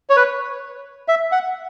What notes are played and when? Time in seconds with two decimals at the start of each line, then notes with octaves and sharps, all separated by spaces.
0.10 C#5
0.16 B4
1.08 E5
1.32 F#5